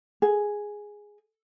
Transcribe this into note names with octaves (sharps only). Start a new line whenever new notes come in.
G#4